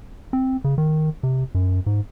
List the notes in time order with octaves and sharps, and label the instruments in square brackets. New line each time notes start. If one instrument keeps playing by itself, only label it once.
[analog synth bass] C4
C#3
D#3
C3
F#2
G#2